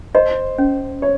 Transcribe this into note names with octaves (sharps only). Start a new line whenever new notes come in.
C5 D#5
C#4
C#5